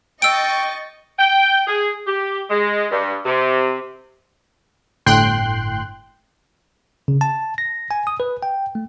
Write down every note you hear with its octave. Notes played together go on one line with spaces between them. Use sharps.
D#5 G5 C#6 E6 A6 D7
G5
G#4
G4
G#3
G2
C3
G1 A2 G5 C6 F#6
C#3
A5
A#6
G#5
D#6
B4
G5
A3